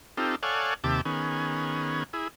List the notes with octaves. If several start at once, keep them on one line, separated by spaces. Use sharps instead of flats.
C4 D#4 F4 G4 A4
A4 C#5 D5 F5 F#5 G#5
D#2 C3 G4 E5 A5 D6
D#3 B3 C#4 G#4
E4 G#4